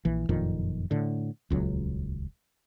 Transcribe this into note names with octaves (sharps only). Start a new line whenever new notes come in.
A#1 E3
F#1 F2 A#2 D#3
A2 D3
D#1 C#2 F#3